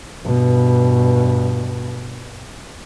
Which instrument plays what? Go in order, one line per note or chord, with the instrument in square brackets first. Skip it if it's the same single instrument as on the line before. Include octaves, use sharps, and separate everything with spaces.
[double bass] G2 B2